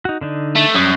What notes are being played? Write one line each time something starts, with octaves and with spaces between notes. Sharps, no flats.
D#4 F#4
D3 D4 D#4
A3
F#2 F#3 G3 D#6